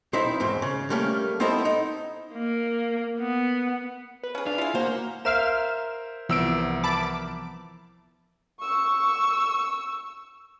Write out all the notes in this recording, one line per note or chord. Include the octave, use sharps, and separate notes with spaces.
B1 C4 D#4 E4 E5
E2 G#2 C4
C#3
G3 A3 A#3 C#4
B3 C4 D#4 E4 A4
D#4
A#3
B3
B4
C#4 G#4
D4 F5
E4 F4 G#4
A#3 F#4 C5
A#4 C5 E5 F5 F6 E7
C2 E3 F3 B3 E6 D7
A5 B5 D6
C#6 E6